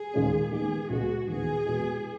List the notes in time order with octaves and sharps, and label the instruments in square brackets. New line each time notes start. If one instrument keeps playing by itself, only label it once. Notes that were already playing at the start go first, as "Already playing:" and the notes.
Already playing: [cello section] G#4
[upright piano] D#2 C#3 G#3 C#4
[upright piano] D#3 G#3 B3 [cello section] G#4
[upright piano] C#2 B2 G#3 [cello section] F#4
[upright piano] D#2 C#3 E3 B3 [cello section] G#4
[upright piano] E2 B2 G#3 B3 F#4